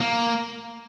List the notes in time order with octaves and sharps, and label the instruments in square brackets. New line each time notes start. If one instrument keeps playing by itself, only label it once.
[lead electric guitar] A#3